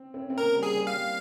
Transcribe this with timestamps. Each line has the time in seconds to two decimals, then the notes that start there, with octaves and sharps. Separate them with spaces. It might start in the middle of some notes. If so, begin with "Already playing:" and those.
Already playing: C4
0.14 C4
0.22 C#4
0.30 C4
0.38 A#3 A#4
0.56 G3
0.63 G#4
0.75 G3
0.87 F5
0.93 G3